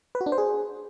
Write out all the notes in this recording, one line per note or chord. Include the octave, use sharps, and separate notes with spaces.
B4
F#4
D4
C5
G#4